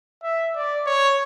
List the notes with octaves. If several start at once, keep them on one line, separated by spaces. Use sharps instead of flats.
E5
D5
C#5